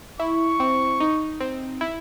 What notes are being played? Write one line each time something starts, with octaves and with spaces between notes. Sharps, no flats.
E4 C#6
C4
D#4
C4
E4